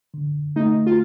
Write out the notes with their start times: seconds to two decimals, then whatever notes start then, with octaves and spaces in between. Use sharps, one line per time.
0.14 D3
0.56 A3 D#4
0.87 F4